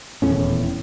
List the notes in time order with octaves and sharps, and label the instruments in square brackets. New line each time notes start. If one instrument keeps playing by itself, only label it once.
[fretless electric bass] D#1 E2 A2 C#4